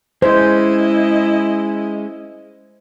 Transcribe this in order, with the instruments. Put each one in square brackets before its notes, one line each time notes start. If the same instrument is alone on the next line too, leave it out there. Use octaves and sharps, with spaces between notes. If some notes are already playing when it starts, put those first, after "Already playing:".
[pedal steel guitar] G#3 C#4 [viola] E4 D#5 [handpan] C5